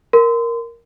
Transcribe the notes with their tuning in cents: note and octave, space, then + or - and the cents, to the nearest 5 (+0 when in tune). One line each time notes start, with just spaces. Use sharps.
A#4 +0 C6 -30